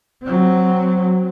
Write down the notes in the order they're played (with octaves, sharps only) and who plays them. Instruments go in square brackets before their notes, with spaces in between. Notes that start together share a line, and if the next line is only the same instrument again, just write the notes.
[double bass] F#3 C4